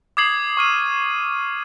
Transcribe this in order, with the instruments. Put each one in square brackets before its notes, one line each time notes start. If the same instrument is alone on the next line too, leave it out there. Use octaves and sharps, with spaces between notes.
[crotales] D6 D#6 G#6 C7 F#7
C#6 F6 D#7